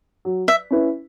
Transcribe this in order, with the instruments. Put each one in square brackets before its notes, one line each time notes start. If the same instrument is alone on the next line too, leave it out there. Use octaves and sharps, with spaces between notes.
[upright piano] F#3
[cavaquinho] E5
[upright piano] C#4 E4 B4